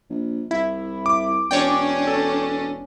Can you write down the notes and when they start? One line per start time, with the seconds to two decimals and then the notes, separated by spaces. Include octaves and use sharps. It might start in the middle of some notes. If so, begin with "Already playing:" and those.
0.10 A#1
0.51 C2 E4
1.06 D6
1.51 E1 C#4 D4 C#5 D5 G5
2.07 A4